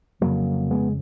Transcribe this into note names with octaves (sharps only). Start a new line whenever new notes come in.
F1 F2 C#3 F#3 A#3
G#3 B3